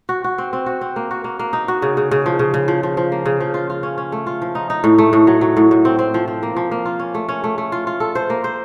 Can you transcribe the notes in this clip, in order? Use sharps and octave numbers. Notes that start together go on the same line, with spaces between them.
F#4
F#4
C4
C4
F#4
C4
A#3
F#4
A#3
A#3
D#4
F#4
C#3
C#3
C#3
F3
C#3
C#3
F3
F3
F3
A#3
C#3
F3
F4
F4
C#4
C#4
A3
F4
F3
D#4
D#4
A2
A3
A2
F#3
F#3
A2
A2
C4
C4
F3
F3
A#3
F3
A#3
F4
C#4
A3
C#4
A3
A3
F4
F4
A4
C5
A#3
C5